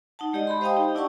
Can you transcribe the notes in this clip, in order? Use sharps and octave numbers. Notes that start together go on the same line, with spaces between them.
D#4 F#5 A5
G#3 G4 D5 D#5
G4 B5 C6
C5 D#5 F5 G5 A5 D#6
D#4 G4
D4 E4 D5 F#5 A5 C#6